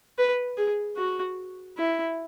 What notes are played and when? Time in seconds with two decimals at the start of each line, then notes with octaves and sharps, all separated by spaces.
0.18 B4
0.57 G#4
0.97 F#4
1.78 E4